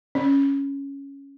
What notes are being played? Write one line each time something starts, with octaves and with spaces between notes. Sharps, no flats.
C#4